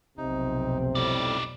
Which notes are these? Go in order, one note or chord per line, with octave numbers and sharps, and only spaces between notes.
F1 B1 C3 C4 D#4
F2 A2 G3 D#4 D5